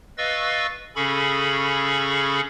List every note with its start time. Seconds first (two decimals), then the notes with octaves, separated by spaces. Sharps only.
0.18 B4 D#5 F5 C#6 E6 A6
0.96 C#3 C#4 G#4 A4 B5 C#6